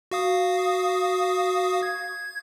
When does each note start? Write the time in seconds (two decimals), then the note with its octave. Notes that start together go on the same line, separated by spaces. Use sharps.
0.11 F#4 F5 D#6
1.83 G#6